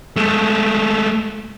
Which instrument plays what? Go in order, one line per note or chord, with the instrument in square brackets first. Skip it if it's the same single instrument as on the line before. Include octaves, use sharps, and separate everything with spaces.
[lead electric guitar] G#3 A3